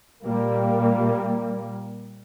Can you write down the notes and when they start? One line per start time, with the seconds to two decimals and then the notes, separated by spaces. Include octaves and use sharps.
0.22 A#2 G3 A#3